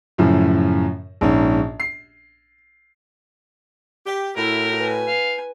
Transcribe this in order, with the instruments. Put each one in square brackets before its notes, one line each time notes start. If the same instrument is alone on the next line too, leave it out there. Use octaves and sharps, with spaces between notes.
[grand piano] F#2 A2 C#3 F3
A#1 G#2 C#4
C7
[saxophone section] G4
[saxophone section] A2 F#4 [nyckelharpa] E4 [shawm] A#4
[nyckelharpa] B4 G#5
[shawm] F5